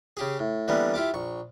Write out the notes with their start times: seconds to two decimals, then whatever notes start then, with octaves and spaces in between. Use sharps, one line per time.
0.17 C#3 G4 G#4
0.39 A2
0.68 D3 E3 G3 A#3 B3
0.94 E4 F4 G4 D6
1.14 A#1 C#6